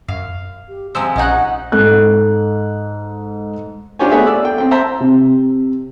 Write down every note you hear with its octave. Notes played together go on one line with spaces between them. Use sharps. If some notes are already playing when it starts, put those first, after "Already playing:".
F#2 F5
G4
C3 F3 G#3 C5 G#5 E6
A#1 C#4 D#4 D#5 F#5 F#6
G#2 A4 F#6
D4 F4 G4 C5 C#5 G#5
A3 B3 G#4 C#5 E5
D5 E6
A4 G5
C4 G5
C5 E5 A5 A#5 C6
C3